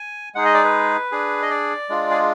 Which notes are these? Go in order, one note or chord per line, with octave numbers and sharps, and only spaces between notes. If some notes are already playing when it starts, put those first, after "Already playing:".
Already playing: G#5
G#3 D#4 G#4 F#5
D#5
D5
B4
D4 G#4
D#5
D5
G#3 D4 F4
G#4